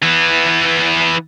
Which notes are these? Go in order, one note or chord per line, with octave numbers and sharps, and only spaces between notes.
E3 B3